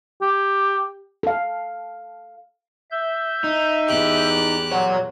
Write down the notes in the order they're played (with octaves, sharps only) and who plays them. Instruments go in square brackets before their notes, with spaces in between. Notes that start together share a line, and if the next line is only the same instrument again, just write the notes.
[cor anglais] G4
[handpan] A4 F5
[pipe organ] E5 G6
[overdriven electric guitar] D#4
[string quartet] E2 G4 F#6
[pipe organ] A#2 F#3 [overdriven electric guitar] C#5 F#5